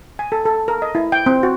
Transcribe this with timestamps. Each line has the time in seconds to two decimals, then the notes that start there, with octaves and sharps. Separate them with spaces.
0.19 G#5
0.32 A4
0.46 A4
0.68 A#4
0.82 D#5
0.95 E4
1.12 G5
1.26 C4
1.43 F#4